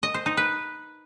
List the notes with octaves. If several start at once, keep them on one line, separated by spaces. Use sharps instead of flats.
D#5
C5
D#4
B4